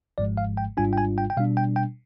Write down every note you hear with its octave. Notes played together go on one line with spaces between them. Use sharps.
G#1 G#2 F3 G#3 D5
F5
G5
G#1 G#2 G3 D4 F4 G#5
G5
G#5
G5
G5
B2 G3 D4 F5
G5
G5